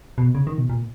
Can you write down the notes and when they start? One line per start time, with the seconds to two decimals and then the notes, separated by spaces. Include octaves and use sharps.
0.18 B2
0.35 C#3
0.47 D#3
0.58 B2
0.70 A#2